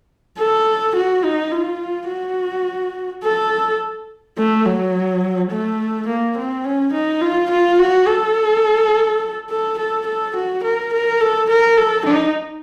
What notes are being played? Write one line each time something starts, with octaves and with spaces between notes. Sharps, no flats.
A4
F#4
D#4
F4
F#4
A4
A3
F#3
A3
A#3
C4
C#4
D#4
F4
F4
F#4
A4
A4
A4
A4
F#4
A#4
A#4
A4
A#4
A4
D#4